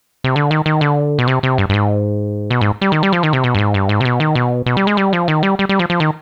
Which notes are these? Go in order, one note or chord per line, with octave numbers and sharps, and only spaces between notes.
C3
D3
D#3
D#3
D3
B2
C3
C3
G2
G2
G#2
B2
G#2
G3
D#3
G3
F3
D#3
C3
B2
G2
G#2
G2
G#2
C3
B2
D#3
B2
B2
G3
G#3
G3
F3
D#3
G3
G3
G3
F3
F3
D#3